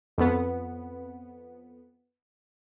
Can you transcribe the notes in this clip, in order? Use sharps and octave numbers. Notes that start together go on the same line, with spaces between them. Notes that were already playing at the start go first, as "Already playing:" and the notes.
F2 B3